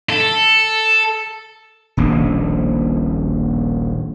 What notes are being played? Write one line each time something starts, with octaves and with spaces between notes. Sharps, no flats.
A4
D#1 A#1 B2